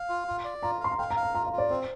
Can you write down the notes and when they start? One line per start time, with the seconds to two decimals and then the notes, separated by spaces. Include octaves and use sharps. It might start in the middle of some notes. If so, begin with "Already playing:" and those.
Already playing: F5
0.09 F4
0.28 F4
0.44 D5
0.63 F4 A#5
0.80 F5 C6
0.92 A#5
0.98 F5 G5
1.11 A#5
1.17 F5
1.23 A#5
1.35 F4 A#5
1.46 F5
1.53 F4
1.58 D5
1.70 C4 C5